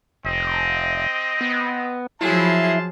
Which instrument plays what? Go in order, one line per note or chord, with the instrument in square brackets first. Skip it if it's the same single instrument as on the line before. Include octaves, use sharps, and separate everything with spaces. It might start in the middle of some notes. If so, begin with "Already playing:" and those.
[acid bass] F1 [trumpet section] C4 D#5
[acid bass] B3
[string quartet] F3 F#3 G#4 [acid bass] E4 [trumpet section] F5 A5 C6